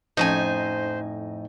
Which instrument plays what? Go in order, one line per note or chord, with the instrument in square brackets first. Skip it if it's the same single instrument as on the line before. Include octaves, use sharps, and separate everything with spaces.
[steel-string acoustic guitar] F2 A2 G#5 [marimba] F3 C#4 A4 [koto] D#4 [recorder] C5